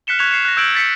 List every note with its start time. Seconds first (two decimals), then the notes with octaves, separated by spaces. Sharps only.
0.07 F6 F#6 B6 C#7 E7 G7
0.19 C#6 F#6 G#6 B6 F7
0.31 C7 C#7 E7
0.45 F#6 A#6
0.57 E6 G6 G#6 D7 F#7
0.75 A6 B6 C#7